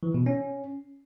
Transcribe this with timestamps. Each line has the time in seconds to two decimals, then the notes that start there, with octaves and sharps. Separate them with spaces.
0.03 E3
0.14 B2
0.26 C#4